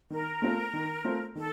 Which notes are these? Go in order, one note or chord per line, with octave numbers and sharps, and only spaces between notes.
D#3 A#4
A3 C4 F4 C5
D#3
A3 C4 F4 C5
D#3 A4